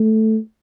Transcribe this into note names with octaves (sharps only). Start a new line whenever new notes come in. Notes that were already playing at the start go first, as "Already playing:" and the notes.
Already playing: A3